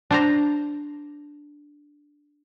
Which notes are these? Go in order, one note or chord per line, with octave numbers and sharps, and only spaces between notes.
D4 C5 A#5